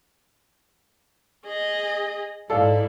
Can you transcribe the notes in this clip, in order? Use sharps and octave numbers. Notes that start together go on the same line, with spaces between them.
G#4 D#5
G#2 E4 A4 D5 F5